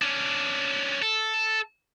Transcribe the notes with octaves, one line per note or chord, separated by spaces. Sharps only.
C#4 D4
A4